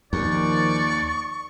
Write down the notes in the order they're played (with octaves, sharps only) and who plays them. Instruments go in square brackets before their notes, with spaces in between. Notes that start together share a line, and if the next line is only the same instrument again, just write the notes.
[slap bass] D#2 [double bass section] D#3 F3 [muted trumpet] D5 [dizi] C#6